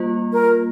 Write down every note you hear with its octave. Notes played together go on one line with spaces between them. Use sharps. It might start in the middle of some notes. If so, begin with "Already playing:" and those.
Already playing: G3 A#3 F4
A#4